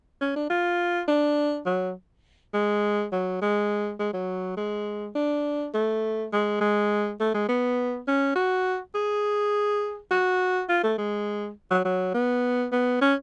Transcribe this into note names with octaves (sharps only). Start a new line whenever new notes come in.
C#4
D4
F4
D4
F#3
G#3
F#3
G#3
G#3
F#3
G#3
D4
A3
G#3
G#3
A3
G#3
B3
C#4
F#4
G#4
F#4
F4
A3
G#3
F#3
F#3
B3
B3
C#4